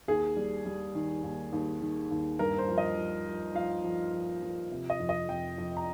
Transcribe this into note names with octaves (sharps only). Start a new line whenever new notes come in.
D#2 G#4
G3
G3
D#3
D#2
D#2
D#3
D#2
G2 A#4
C5
F3
D#5
F3
F3
F3 F5
F3
F3
F3
C3
D#5
F2
D#5
F2 G5
F2
A#5